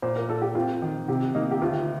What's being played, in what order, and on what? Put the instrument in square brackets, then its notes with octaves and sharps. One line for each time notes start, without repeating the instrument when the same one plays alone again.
[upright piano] A#2 [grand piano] C5
[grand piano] A#4
[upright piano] A#2 [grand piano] A4
[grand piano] G4
[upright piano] C4 [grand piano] F4
[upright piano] D#3
[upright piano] C3 [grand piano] G4
[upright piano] A#3 [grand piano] D#4
[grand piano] G4
[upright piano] D2 [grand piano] F4